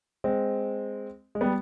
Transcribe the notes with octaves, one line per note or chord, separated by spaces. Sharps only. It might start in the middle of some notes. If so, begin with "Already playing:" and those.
G#3 C4
G#3
G3 B3